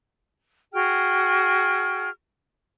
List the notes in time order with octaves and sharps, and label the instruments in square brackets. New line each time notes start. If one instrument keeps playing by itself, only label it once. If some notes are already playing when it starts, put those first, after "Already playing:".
[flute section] F#4 G#4 G5 F6